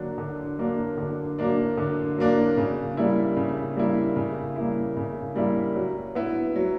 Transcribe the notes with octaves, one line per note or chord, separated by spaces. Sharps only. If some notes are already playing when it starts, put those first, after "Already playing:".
Already playing: D3 F#3 A#3 D4
D3
F#3 A#3 D4
D3
F#3 A#3 D4
D3
F#3 A#3 D4
C#3
G3 A#3 E4
C#3
G3 A#3 E4
C#3
G3 A#3 E4
C#3
G3 A#3 E4
F#3
B3 E4
F#3